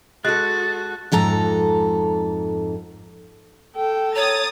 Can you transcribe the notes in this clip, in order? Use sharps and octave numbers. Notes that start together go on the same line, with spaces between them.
G#3 F#4 A4 F#6 A6
F2 G#2 A4 A#5
A4 G5
C#5 A#5 D#6 A6